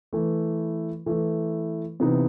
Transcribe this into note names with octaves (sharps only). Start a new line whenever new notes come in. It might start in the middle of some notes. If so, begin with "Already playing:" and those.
E3 A3 E4
E3 A3 E4
C3 E3 B3 D#4